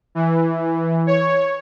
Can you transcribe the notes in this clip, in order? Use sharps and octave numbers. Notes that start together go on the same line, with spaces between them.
E3
C#5